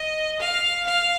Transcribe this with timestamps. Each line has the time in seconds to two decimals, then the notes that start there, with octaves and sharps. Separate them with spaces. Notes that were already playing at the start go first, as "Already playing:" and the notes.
Already playing: D#5
0.39 F5
0.86 F5